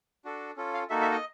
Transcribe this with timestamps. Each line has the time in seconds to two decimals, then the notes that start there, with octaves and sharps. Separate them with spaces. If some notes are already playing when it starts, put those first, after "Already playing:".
0.25 D4 F#4 A4
0.57 C#4 F4 A4
0.74 F5
0.90 A#3 D#4 F#4 A4 E5
1.01 E5
1.12 D#5